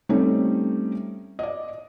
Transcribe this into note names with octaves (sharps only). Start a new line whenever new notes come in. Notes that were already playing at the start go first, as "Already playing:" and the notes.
G3 A3 C4 C#4 D#4
D5 D#5